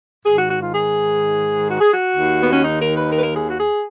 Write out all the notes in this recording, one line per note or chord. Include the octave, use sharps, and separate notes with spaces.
G#2 D#3 G#4
F#4
F#4
F4
G#4
F#4
G#4
F#4
D#2 D#3
B3
C#4
D#4
A#4
B4
A#4
B4
A#4
G#4
F#4
G#4